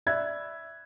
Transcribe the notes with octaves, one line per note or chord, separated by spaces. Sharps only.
D5 E5 B5 E6 F#6 G#6